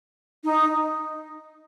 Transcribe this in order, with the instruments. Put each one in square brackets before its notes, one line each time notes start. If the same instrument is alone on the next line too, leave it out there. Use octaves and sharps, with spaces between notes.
[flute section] D#4